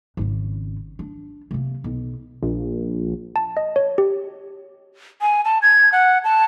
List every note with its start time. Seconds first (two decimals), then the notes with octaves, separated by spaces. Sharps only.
0.17 G#1 C#3
0.99 D4
1.51 C3 A#3
1.84 B1
2.43 A#1
3.36 A5
3.57 D#5
3.76 C#5
3.98 G4
5.21 G#5
5.45 A5
5.62 G#6
5.92 F#5
6.24 A5